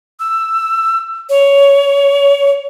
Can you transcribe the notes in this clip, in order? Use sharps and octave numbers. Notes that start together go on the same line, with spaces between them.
E6
C#5